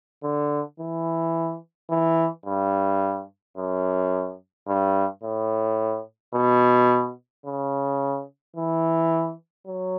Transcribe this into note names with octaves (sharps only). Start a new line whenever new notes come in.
D3
E3
E3
G2
F#2
G2
A2
B2
C#3
E3
F#3